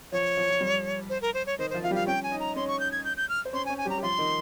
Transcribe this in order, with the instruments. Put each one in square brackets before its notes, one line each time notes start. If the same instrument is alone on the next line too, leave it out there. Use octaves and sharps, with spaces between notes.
[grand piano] F3 [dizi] C#5
[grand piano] F3
F3
G3
[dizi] C5
A#4
C5
C#5
[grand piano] D#3 D#4 [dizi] C5
[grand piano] F3 F4 [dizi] C5
[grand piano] F4 [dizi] F5
[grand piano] G3 G4
[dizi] F5
[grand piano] C#4 C#5 [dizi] G5
[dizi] G#5
[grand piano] D#4 D#5
[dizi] A#5
[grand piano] C#4 C#5 [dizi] C6
[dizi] C#6
G6
G#6
G6
G6
F6
[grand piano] C5
[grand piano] C#4 C#5 [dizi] C6
[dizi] G#5
[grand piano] C#4 C#5
[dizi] G#5
[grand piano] G3 G4
[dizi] A#5
[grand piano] G4
[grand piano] F3 F4 [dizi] C6
[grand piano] D#3 D#4